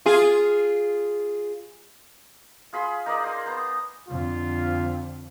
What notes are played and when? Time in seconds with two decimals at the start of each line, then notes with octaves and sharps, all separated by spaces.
0.06 F4 G#4
2.73 F4 G#4 B5 C6
3.06 D#4 A#4 D5 D#5
3.24 C5 G#5
3.46 B3 A#5
4.08 F2 D3 F4